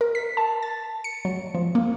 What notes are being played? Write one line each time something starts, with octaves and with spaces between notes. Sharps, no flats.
A#4
B6
A5
A6
C#7
F#3
F3
A#3